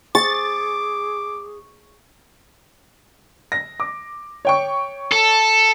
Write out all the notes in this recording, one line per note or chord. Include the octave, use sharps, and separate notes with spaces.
G#4 C#6 D6 A6
A#6
D6
C#5 G5 C#6
A4